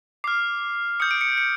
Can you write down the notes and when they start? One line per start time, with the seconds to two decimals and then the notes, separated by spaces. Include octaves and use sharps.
0.24 D6 F6 C7
1.00 D#6 G6 C#7
1.11 D7
1.21 C#7
1.38 C#7